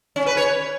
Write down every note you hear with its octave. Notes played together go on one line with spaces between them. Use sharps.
C#4
B4
C#5